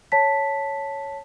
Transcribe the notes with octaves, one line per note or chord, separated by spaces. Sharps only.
C#5 A5 B6